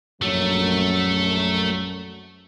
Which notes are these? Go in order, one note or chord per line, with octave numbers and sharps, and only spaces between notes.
A#1 F#2 F#3 A3